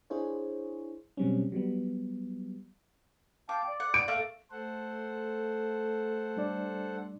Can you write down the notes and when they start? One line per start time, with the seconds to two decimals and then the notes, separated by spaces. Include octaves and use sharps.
0.10 D4 E4 G#4 C5 C#5
1.17 B2 F#3 G3 C4 C#4
1.52 F#3 G3 B3
3.49 F5 G5 A5 D6
3.68 D5
3.80 F#5
3.94 D7
4.08 A3 A#3
4.51 A3 A4 C5 F#5
6.37 G3 D4 D5